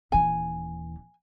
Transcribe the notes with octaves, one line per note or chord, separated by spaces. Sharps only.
D#1 E3 G#5